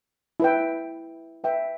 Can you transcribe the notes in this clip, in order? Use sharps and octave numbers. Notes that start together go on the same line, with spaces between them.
E4 B4 E5 G5
B4 E5 G5